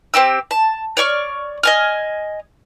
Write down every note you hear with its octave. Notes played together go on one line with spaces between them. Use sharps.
C4 D#4 G4 E6
A5
C#5 D5 C#6 F6
D#5 G#5 F6